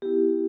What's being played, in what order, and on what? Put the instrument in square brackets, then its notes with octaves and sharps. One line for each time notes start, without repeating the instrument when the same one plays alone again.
[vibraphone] B3 E4 G4